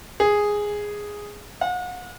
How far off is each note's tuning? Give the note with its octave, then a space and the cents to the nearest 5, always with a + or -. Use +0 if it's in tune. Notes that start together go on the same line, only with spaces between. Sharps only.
G#4 -5
F#5 -40